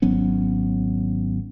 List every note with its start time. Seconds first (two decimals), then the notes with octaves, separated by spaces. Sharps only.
0.02 G#1 F#3 B3 C#4